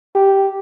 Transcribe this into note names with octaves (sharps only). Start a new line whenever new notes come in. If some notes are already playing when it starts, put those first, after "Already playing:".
G4